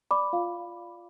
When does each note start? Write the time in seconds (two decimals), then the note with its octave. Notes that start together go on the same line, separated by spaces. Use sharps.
0.11 D5 B5 D6
0.33 F4 F5